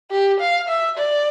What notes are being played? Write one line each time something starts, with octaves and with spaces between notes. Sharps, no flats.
G4
F5
E5
D5